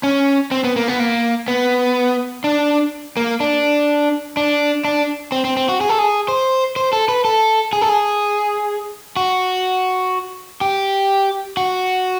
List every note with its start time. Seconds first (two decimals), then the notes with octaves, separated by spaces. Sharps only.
0.03 C#4
0.51 C4
0.64 B3
0.76 A#3
0.88 B3
1.00 A#3
1.48 B3
2.44 D4
3.17 A#3
3.40 D4
4.37 D4
4.85 D4
5.32 C4
5.45 C4
5.57 C4
5.69 F#4
5.81 G#4
5.89 A4
5.99 G#4
6.28 C5
6.76 C5
6.93 A4
7.08 B4
7.25 A4
7.73 G#4
7.81 A4
7.89 G#4
9.17 F#4
10.61 G4
11.57 F#4